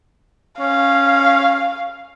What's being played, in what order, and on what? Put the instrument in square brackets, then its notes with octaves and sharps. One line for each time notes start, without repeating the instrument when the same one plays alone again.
[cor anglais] C#4 [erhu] F5